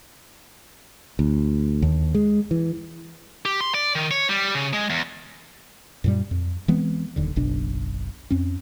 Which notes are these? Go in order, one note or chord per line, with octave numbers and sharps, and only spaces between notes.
D2
D#2
G#3
E3
G4
C6
D5
D#3
C#5
G3
C#3
G#3
E2
F#2 A#2 G3
F2
E3 G#3 B3 C4
D#1 D#2 D3
F#1 B1 B2 D4
F2 C4 C#4